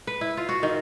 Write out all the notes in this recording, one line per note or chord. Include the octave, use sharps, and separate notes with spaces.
B4
E4
F4
F#4
D#3